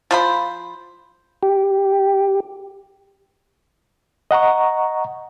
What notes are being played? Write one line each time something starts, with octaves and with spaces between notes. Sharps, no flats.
F3 C5 B5
G4
D#5 F#5 A#5 C#6